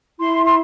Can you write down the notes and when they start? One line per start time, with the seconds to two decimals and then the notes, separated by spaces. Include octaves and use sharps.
0.18 E4 C6
0.43 C6